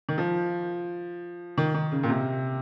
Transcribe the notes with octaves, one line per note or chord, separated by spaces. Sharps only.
D#3
F3
D#3
D#3
C#3
A#2
C3